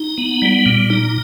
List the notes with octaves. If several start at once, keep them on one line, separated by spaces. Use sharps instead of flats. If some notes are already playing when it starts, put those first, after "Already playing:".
Already playing: D#4
B3
G3
A#2
D#4